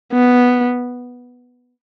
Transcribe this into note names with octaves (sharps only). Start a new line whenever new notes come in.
B3